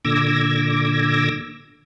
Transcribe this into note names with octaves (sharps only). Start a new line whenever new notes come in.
A#2 D3 D6 E6 G#6 A#6